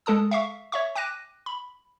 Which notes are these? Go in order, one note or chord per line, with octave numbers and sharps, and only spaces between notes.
G#3 A4 A5 D#6
E5 F5 C#6
C#5 E5 C#6
G5 D6 F#6 A#6 D#7
B5